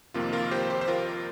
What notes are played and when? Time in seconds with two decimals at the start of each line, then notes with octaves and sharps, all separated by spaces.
0.14 F2 C3 D#3 A#3 F4
0.33 F4 A#4
0.51 G4 C5
0.70 G4 C5
0.81 C5
0.88 F4 A#4